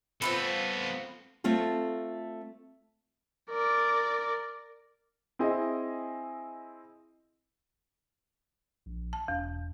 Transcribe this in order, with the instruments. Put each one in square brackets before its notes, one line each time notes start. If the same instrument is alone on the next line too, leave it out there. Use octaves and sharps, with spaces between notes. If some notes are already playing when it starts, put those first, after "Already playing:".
[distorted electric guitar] B3 A4 [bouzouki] C4 F4 B4
[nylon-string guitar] A3 C4 F4 A4
[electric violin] A#4 D5
[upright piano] C4 E4 G#4 D#5
[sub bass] A#1
[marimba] A5
[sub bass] E1 [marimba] E2